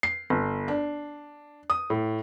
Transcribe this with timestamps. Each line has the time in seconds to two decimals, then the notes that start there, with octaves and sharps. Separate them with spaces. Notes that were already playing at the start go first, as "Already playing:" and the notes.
0.03 C7
0.30 G1
0.68 D4
1.70 D#6
1.90 A2